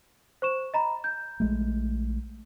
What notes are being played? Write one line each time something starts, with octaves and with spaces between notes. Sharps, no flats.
C5 C#6 E7
D#5 A#5 B5
G6
A#1 G#3 A3